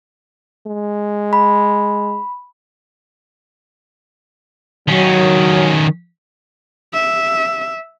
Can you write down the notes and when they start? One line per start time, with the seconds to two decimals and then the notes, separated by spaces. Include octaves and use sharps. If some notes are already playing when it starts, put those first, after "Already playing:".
0.67 G#3
1.33 B5
4.88 D#3 F#3 C#4
6.94 E5